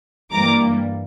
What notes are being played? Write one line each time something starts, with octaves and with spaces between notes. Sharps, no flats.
G2 E3 G3 A#3 A#5 D6